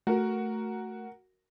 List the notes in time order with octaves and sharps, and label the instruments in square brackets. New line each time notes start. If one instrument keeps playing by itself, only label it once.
[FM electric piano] A3 [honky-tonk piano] F#4 A#4